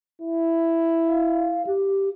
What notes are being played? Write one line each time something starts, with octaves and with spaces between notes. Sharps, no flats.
E4
F5
G4